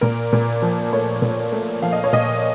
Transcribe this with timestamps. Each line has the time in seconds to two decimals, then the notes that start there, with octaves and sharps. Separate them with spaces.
0.01 A#2 A#4
0.33 A#2
0.62 F3
0.92 A3 C#5
1.22 A#2
1.52 A3
1.82 F3 F5
1.92 D#5
2.04 C#5
2.13 A#2 D#5